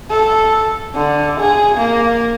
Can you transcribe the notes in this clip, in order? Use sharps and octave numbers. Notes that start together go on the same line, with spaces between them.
A4
D3
G#4
A#3